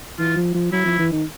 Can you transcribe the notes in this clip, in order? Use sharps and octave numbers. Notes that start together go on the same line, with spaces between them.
E3 F4
F3
F3
F#3 E4
F3
E3
D#3